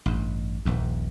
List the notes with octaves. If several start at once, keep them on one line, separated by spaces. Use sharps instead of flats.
A1 G2
D#1 A#1 D#2